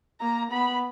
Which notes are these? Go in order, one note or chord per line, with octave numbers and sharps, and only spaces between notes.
A#3 A#5
B3 B5